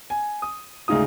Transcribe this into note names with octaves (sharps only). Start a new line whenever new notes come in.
G#5
D#6
D2 G#2 C#3 D#4 F4 D#6